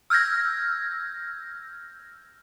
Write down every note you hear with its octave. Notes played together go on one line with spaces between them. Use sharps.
E6 F6 G6 G#6 A#6